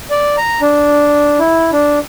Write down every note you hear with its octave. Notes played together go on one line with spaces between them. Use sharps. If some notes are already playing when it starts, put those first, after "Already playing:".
D5
A#5
D4
E4
D4